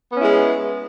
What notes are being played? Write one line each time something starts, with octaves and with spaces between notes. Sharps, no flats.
G#3 B3 C#4 E4